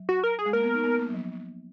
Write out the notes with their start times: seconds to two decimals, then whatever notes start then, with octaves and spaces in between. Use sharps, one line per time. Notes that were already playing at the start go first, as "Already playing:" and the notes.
Already playing: F#3
0.09 F#4
0.24 A#4
0.39 G#4
0.45 G#3
0.53 A#3 A#4
0.63 B3
0.74 D#4
0.84 B3
0.99 A#3
1.08 F#3
1.14 F3